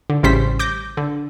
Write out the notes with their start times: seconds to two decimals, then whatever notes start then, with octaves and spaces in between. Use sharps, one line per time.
0.10 D3
0.23 A1 C#3 G3 C#4 C5 B6
0.59 D6 G6 A#6
0.97 D3